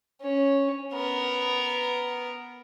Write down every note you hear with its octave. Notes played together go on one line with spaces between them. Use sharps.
C#4
B3 A#4